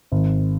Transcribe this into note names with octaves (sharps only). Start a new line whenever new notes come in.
G#1